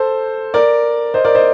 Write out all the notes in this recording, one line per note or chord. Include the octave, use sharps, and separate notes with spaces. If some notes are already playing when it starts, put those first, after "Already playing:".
Already playing: A4 C5
A#4 D5
C5 D#5
A#4 D5
C5 D#5